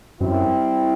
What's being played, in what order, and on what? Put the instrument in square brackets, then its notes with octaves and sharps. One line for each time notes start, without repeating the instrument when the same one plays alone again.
[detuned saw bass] F#2 [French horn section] G3 C4 E4